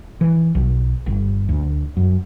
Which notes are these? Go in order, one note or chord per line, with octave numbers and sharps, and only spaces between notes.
E3
B1
G1
D2
F#2